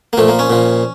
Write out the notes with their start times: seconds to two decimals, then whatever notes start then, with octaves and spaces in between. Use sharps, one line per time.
0.13 A#3
0.17 A#2 F3 A3
0.28 A#3
0.39 C#4
0.50 A#2 F3